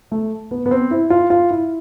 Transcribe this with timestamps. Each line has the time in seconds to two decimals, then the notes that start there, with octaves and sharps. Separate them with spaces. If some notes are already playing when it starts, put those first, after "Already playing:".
0.11 A3
0.51 B3
0.66 B3
0.71 C4
0.91 E4
1.10 F4
1.30 F4
1.51 E4